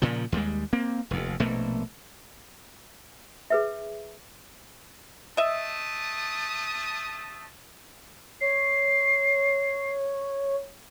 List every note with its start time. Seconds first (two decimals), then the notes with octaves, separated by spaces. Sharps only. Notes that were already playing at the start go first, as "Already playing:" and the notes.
0.02 A#2 C#3 F3
0.32 D#2 G3 G#3
0.73 A#3 C4
1.11 F1 D#2
1.40 A#1 B2 A3 A#3
3.50 G#4 B4 E5
5.37 A3 D#5 E5 A5 D#6
8.41 C#5 C7